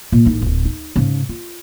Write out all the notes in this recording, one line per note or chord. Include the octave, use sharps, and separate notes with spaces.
A#2
A1 D#4
D1 A#1
D#4
G#2 C#3
F4